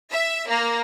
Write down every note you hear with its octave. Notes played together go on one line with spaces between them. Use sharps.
E5
A#3